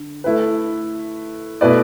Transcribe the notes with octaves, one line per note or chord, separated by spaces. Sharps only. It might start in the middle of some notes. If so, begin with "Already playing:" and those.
Already playing: D3
A3 E4 B4
B2 A3 E4 B4 D5